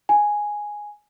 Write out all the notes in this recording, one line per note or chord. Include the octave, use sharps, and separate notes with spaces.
G#5